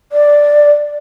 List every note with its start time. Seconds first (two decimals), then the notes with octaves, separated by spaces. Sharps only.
0.12 D5